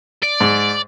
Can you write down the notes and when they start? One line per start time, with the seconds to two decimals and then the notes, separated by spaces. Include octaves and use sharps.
0.23 D5
0.40 G#2